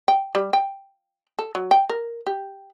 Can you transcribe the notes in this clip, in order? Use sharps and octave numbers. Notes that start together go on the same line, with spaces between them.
G5
G3
G5
A4
F#3
G5
A#4
G4